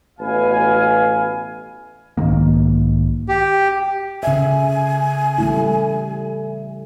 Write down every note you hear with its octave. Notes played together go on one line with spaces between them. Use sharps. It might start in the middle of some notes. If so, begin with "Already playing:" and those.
A1 B2 B4 F5 G#5
B1 G#2 D#3 A#3
G4
C#3 E5 G#5
G3 A3 E4